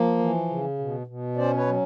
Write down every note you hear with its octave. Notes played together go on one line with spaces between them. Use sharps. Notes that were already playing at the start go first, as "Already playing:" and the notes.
Already playing: F3 A#3
E3
C#3
B2
B2
C#4 C5 D5
B4 C#5
F#3